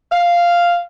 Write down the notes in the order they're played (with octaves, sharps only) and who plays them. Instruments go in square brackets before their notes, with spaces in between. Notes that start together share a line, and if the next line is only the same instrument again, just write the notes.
[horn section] F5